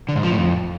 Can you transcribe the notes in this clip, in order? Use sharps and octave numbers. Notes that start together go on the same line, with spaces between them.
D3
G#2
F3
A2
F2